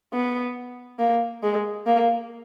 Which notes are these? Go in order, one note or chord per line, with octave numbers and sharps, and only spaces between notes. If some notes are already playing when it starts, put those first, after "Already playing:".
B3
A#3
G#3
A#3